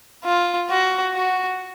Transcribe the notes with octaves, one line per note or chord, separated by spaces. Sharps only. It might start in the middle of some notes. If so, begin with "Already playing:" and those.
F4
F#4
F#4